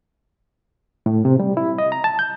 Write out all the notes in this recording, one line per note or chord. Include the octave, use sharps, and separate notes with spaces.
A2
C3
G3
E4
D#5
A#5
A5
G6